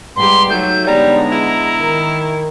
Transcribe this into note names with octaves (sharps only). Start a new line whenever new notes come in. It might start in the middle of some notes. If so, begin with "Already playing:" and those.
G#2 G3 G4 B4 D5 A#5 C6
F#3 A3 D#4 F#4 C#5 G6
D3 G3 G#3 B3 A#5
E4 G#4 D#5
D#3 A#4